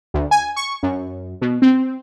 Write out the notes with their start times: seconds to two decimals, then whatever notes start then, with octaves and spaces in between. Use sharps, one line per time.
0.14 D2
0.31 G#5
0.56 C#6
0.83 F#2
1.41 B2
1.62 C4